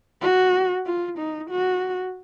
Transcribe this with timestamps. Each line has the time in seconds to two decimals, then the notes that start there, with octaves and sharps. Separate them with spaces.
0.22 F#4
0.86 F4
1.19 D#4
1.51 F#4